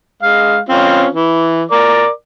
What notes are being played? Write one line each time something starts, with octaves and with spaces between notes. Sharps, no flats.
G#3 F5
C4 C#4 F4
E3
A#4 D5 D6